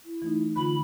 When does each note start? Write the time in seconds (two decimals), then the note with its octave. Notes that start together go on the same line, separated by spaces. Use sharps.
0.05 E4
0.22 E3 A3 D#4
0.56 D3 F4 B5